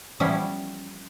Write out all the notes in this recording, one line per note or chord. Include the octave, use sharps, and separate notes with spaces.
E3 F3 G3 B3 C#4 E4